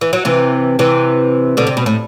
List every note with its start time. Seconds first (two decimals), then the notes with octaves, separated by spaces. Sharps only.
0.01 E3
0.13 F#3
0.25 C3 E3
0.79 C3 E3
1.57 B2 D3
1.67 C3
1.77 B2
1.86 A2